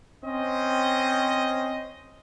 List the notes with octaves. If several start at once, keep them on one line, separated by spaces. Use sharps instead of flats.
C4 C#4 C5 D#5